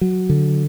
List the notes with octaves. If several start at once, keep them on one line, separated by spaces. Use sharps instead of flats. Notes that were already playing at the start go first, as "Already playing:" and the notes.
F#3
D3